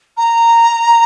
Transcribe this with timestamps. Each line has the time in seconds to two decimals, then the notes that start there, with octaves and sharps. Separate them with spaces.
0.17 A#5